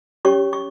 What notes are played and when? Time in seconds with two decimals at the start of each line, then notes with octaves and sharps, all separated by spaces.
0.25 C#4 G4 C#5 C#6
0.53 C#6